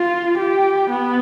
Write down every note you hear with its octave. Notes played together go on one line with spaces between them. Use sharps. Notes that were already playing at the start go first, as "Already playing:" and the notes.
Already playing: F4
G4
B3